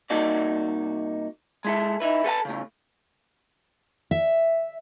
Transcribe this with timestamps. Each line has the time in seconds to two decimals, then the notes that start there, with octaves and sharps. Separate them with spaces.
0.10 C2 A#3 D#4 F#4 D5
1.65 G#3 E4 A4
2.00 D#4 E4 B4
2.24 A4 B4 F#5 A5
2.45 A2 C#3
4.11 E5